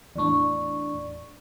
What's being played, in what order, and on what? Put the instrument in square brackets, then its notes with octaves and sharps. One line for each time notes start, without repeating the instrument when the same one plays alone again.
[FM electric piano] E2 A2 D4 [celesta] D5 C#6